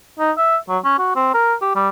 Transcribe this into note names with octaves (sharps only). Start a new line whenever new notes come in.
D#4
E5
F#3
C#4
F#4
C4
A#4
G4
G3